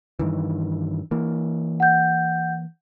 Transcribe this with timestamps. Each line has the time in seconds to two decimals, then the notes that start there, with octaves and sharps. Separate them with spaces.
0.19 G2 D#3 E3
1.11 E3 A#3
1.80 F#5 G6